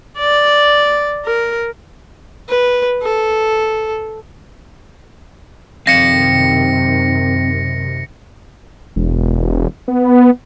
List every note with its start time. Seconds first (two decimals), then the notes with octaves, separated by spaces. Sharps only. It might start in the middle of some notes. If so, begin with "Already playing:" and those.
0.18 D5
1.26 A#4
2.49 B4
3.02 A4
5.87 F#2 C3 D#3 C4 F5 A#6 C#7
8.96 E1
9.88 B3